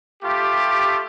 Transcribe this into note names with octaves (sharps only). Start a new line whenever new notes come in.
A3 F4 G4